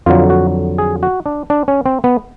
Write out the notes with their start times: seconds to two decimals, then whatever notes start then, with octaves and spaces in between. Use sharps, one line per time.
0.06 F2 D3 F#3 F4
0.30 F#4
0.78 G#4
1.03 F#4
1.26 D4
1.50 D4
1.68 C#4
1.86 C4
2.04 B3